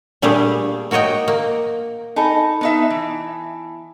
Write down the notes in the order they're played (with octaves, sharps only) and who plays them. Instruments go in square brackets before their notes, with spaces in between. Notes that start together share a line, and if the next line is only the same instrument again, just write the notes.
[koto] A#2 G3 A3 D4 G4 G#4
A#3 F#4 C#5 D#5 G5
A#3
[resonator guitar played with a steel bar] D#4 A4 [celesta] G#5 A5 B5
[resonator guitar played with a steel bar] B3 D#4 E5
E3